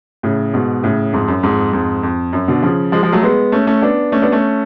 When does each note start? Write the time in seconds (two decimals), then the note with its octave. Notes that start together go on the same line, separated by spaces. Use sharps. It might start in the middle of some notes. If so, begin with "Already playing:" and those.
0.23 A2 C#3
0.54 G#2 B2
0.83 A2 C#3
1.13 F2 G#2
1.28 F#2
1.43 F2 G#2
1.73 F2 G#2
2.03 F2
2.33 F#2
2.48 B2 D3
2.62 C#3 F3
2.92 F3 G#3
3.02 F3 G#3
3.12 F#3 A3
3.23 G#3 B3
3.52 A3 C#4
3.67 A3 C#4
3.82 B3 D4
4.12 A3 C#4
4.22 B3 D4
4.32 A3 C#4